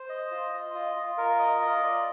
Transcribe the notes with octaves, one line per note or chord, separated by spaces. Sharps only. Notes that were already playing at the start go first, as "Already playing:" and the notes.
Already playing: C5
D#5
F4
D#5
F4
F4
A#4
D#5
F4
D5